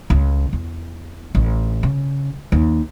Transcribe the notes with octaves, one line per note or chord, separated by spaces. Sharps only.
C#2
E2
A1
C#3
D#2